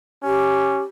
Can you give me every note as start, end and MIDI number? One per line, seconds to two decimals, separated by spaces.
0.24 0.82 61
0.24 0.82 67